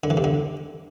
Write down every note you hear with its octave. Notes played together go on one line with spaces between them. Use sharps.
D3
E3
C3
D3